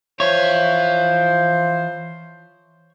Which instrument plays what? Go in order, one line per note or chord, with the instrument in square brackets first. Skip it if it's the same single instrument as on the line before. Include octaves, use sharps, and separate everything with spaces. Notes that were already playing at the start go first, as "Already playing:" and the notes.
[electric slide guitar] E3 E5 [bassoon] F3 [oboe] C5 [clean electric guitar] C#5